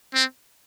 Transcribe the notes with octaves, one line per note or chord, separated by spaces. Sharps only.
C4